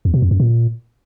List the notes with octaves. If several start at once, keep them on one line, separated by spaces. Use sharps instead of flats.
E2
B2
F2
F#2
A#2